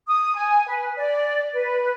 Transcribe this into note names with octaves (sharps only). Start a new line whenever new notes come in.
D#6
G#5
B4
D5
B4